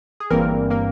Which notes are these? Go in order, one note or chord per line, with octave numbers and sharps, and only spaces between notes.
G#4
G1 G2 E3 G3 A#3 C4 A#4
A#3 A#4